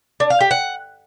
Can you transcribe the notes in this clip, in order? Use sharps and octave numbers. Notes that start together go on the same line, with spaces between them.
D4
F5
G4
F#5